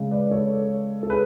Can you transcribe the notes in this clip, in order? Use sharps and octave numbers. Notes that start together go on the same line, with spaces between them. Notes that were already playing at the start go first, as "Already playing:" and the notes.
Already playing: C#3 G#3
B4 D5
A4 C#5
A4
G#4 B4